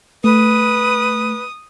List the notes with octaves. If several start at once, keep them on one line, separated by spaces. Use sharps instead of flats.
A3 B4 D#6